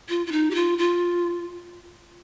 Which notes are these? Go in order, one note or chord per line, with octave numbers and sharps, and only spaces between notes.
F4
F4
D#4
G4
F4
F4